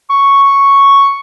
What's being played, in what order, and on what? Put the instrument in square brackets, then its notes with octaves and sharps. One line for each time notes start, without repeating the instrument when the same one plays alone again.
[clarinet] C#6